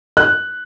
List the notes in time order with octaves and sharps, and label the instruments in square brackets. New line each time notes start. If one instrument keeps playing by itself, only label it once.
[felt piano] F#6